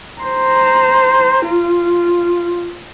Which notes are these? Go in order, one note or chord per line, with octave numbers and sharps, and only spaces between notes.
C5 A#5
F4